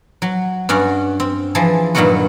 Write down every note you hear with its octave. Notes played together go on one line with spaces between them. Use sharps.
F#3
G2 C#4 F#4 D5
C4
E3 F3 G#4 A5
G2 A#2 D#3 F#3 B3 F#4